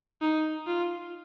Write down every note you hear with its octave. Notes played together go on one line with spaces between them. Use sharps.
D#4
F4